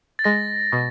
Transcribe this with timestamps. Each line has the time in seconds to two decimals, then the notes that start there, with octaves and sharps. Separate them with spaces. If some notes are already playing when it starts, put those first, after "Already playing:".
0.19 A6
0.24 G#3 A#6
0.72 B2